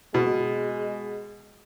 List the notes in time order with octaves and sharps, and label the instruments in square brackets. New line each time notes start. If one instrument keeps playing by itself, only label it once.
[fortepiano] B2 [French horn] G#3